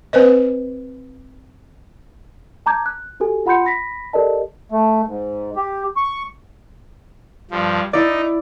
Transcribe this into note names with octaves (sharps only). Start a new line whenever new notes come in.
C4 B4 C5 D#5
A5 A#5 D6 G6 G#6
F#6
F#4 G4 A4 G#5
F4 F#5 B5 C6 G6 C#7
B5 A#6 B6
G4 A4 A#4 D5 D#5 A5
A3
G#2
G4
C#6
G2 F3
D#4 E4 D5